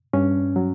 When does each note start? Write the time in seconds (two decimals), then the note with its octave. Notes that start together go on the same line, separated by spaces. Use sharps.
0.13 G2 C#4
0.56 F#3